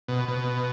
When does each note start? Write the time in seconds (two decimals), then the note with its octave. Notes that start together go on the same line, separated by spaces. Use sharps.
0.08 B2
0.28 B2